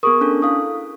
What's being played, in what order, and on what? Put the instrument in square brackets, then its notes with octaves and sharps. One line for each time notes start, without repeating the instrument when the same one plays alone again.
[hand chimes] B3 G#4 A#4 [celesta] C#6 D#6
[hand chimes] C#4 D4 A4
[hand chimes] E4 F5 [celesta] A4 D#6